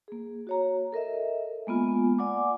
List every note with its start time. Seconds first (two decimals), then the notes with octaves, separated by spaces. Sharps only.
0.08 A#3 G#4
0.47 F#4 C#5 A#5
0.92 A4 A#4 D#5 E5
1.67 G#3 A#3 B3 F4 G#5
2.19 D5 F#5 G#5 D6